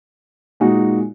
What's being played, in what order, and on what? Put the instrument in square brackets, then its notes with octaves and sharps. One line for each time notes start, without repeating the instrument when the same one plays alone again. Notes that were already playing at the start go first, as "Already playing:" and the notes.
[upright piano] A#2 G#3 D#4 F#4